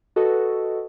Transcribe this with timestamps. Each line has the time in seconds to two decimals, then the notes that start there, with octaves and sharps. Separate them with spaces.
0.16 F#4 A4 B4 D#5